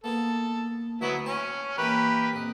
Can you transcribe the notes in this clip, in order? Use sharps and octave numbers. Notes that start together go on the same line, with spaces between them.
A#3 B3 G#4 A4
D2 F#3 B3 E4 B4 D#5
C#4 G#5 A5
E3 A#3 G4 A#4 B4
A#1 F2 D#5